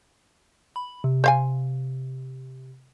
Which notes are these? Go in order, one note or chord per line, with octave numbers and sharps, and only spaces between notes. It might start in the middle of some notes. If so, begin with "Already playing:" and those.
B5
C3
C5 F5 G#5